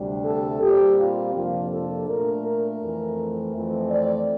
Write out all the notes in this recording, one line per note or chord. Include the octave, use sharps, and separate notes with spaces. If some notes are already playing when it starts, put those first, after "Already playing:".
Already playing: D2 C3 G3 D4
A4
A#2 G3 C4 G4
F4
F2 C3 F3 A#3 D4 F4
A4
A#2 A3 D4 A#4
A#4
F2 E3 A3 C4
F2 E3 A3 C4
D5